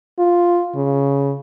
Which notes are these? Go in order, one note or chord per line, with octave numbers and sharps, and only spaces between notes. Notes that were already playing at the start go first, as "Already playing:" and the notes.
F4
C#3